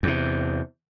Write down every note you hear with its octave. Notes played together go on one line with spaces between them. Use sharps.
E2 C3